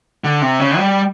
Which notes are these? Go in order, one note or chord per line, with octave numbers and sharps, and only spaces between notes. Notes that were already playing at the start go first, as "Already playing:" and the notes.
D3
C3
C#3
G3